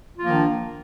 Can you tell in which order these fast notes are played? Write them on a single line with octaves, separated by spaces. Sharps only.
F4 F3 A#3 D#3 D4